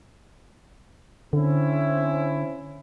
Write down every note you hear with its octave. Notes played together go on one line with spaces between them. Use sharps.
D3 C4 C#4 E4